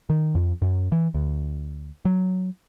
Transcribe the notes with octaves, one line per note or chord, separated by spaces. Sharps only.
D#3
F2
F#2
E3
D2
F#3